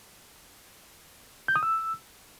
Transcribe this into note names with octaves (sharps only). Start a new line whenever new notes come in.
G6
D#6
E6